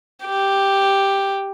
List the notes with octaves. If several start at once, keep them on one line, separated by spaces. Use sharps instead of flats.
G4